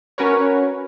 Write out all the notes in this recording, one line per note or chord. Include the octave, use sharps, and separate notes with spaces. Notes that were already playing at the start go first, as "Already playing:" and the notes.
C#4 F#4 A#4 B4 C#5